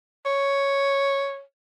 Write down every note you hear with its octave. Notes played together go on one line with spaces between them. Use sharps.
C#5